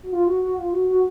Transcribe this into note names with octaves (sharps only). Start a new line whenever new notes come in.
F#4
F4
F#4
F#4
F4
F#4
F#4